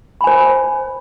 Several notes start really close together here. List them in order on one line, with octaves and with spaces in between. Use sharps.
B5 G#5 C5